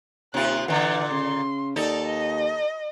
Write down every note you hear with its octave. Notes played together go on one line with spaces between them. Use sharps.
D#2 C3 F4 F#6
A#2 D3 E3 F#5
C#3 C6
D#2 D#4 A4 D5
D#5